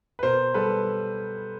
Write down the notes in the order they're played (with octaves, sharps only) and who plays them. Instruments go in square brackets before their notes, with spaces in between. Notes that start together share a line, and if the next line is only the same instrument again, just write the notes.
[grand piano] B4
B2 A#4 C5
G3 A4 B4